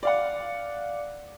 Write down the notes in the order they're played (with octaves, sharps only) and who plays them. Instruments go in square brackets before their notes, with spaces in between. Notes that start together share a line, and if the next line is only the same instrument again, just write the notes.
[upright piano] D5 F5 F#5